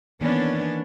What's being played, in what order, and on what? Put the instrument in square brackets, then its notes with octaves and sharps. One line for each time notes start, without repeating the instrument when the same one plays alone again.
[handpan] D#3 E3 A#3 [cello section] B3 C#4 D4